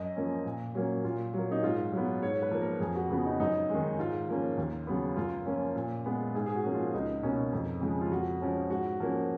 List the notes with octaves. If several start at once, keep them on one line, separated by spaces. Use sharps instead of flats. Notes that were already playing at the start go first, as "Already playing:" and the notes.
Already playing: F#2 D#5
F3 A#3 C#4
A#2
F#3 A#3 C#4
A#2 F4
F#3 A#3
D#4
G#2 F4
F#3
B3
G#2 C#5
B4
F3 A#3
A#4
F2 G#4
F#4
C#3 F3 B3
D#4
F#2 D#4
D#3 G#3
G#2 F4
F3 A#3 C#4
D#2
C#3 F#3 B3
F#2 F4
F3 A#3 C#4
A#2
G#3 B3
G#2 G#4
G#4
F#4
F3 A#3 C#4
F4
C#2 D#4
B2 A#3 C#4
F2
C#3 F3 G#3
F4
F2 F#4
F3 G#3 C#4
G#2 F#4
F3 A#3 C#4